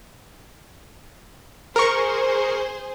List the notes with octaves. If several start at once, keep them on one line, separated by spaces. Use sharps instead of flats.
G#4 A#4 C5 C#6